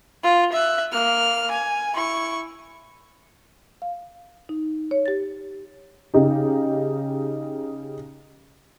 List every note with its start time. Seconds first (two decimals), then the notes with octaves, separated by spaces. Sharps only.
0.23 F4
0.53 E5 F#6
0.92 A#3 F6
1.51 G#5
1.94 E4 C#6
3.82 F5
4.49 D#4
4.91 C#5
5.06 G4 A6
6.14 C#3 D#4 G4